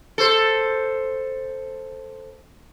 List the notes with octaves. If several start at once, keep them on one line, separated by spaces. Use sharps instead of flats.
A4 C5